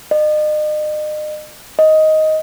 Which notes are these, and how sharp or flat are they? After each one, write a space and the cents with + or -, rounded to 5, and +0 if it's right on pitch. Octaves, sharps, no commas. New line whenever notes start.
D#5 -40
D#5 +10